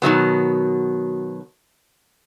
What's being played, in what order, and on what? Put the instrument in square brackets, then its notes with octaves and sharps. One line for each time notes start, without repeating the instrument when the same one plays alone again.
[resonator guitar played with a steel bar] B2 D#3 F#3 B3